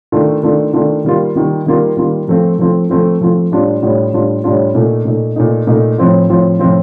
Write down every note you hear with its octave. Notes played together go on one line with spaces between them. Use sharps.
D#3 A3 D4 F4
D#3 A3 D4 F4
D#3 A3 D4 F4
D#3 G3 A#3 F4
D#3 G3 A#3 F4
D#3 G3 A#3 F4
D#3 G3 A#3 F4
F3 A3 C4 F4
F3 A3 C4 F4
F3 A3 C4 F4
F3 A3 C4 F4
A2 G3 D4 F4
A2 G3 D4 F4
A2 G3 D4 F4
A2 G3 D4 F4
A#2 A3 D#4
A#2 A3 D#4
A#2 A3 D#4
A#2 A3 D#4
A2 F3 C4 F4
A2 F3 C4 F4
A2 F3 C4 F4